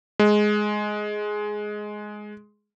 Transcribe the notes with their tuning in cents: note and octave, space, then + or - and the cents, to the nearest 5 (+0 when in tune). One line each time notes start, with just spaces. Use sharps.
G#3 +10